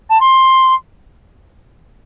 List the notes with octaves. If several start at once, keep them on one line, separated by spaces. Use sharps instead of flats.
A5
C6